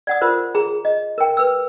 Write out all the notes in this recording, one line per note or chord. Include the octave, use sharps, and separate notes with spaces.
D5 F#5 D#6
F4 A#4 C5
G#4 A#5
D#5
A#4 G5
B4 E6